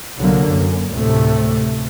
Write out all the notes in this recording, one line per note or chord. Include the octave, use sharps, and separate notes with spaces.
C2 D3 F#3 A#3
F#2
D2 A2 C3 A3